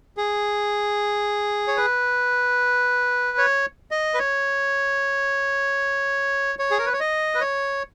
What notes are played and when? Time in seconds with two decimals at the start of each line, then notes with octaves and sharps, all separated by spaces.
0.17 G#4
1.68 C#5
1.77 B4
3.38 C#5
3.91 D#5
4.14 B4
4.19 C#5
6.59 C#5
6.71 G#4
6.79 A#4
6.86 B4
6.93 C#5
7.00 D#5
7.35 B4
7.41 C#5